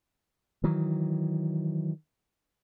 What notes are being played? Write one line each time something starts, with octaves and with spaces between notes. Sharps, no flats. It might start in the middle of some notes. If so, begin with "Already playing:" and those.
D#3 E3 F#3